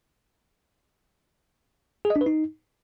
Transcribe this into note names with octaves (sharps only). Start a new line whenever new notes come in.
G#4
D#5
D4
B4
D#4